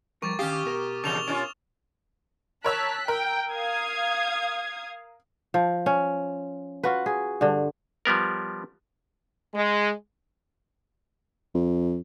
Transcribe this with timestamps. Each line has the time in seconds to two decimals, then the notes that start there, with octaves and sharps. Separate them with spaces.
0.22 F3 G3 A#4 C#6 D6 A6
0.39 D#3 C#4 G4 F5 D#6 F6
0.65 B2 A#4
1.04 E2 C#3 D6 F7 G7
1.27 C#4 D4 F4
2.64 A#4 C#5 A5 E6 F#6 B6
3.08 A#4 G5
3.53 F5 D#6 G#6
5.54 F3
5.86 C#4
6.83 F4 F#4 B4
7.06 G#4
7.41 G2 D3
8.05 F3 G3 B3 A#4
9.55 G#3
11.55 F2